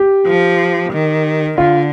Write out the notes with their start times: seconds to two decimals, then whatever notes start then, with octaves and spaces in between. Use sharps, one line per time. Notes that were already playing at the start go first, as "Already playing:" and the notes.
Already playing: G4
0.26 F3
0.93 D#3
1.58 D3 F4